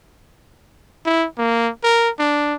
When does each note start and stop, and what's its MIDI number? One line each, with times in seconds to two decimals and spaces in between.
1.06 1.27 64
1.38 1.70 58
1.84 2.10 70
2.19 2.55 62